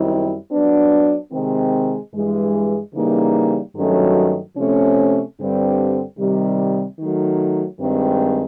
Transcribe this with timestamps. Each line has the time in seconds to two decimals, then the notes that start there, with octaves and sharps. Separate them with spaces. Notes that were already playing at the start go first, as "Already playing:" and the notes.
Already playing: F#2 D#3 G3 C4 E4
0.51 F#3 B3 D4
1.32 C3 D#3 G#3 C4
2.14 G2 E3 G#3
2.94 C#3 E3 G3 A#3 D#4
3.75 G2 D#3 F#3 A3 C#4
4.56 C3 F3 A3 C#4
5.38 G2 D3 G3 C4
6.18 C3 D#3 G3
6.99 D#3 F#3 A3
7.80 G2 D#3 G#3 C4